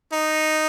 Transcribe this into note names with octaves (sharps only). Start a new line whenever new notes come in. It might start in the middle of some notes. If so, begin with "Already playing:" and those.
D#4